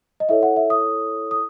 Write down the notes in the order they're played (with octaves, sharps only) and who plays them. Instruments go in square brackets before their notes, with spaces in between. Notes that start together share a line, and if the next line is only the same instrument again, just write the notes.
[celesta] D#5
E4 A4 C#5 E5
F#5
E5
D#6
D#6